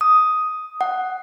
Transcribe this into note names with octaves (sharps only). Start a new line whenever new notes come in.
D#6
F#5